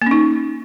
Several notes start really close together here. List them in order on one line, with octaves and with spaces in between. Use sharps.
A#3 C#4 D#4